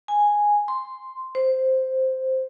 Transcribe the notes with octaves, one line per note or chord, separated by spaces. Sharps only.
G#5
C6
C5